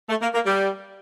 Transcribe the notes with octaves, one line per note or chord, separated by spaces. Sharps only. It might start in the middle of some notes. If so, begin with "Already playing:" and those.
A3
A#3
A#3
G3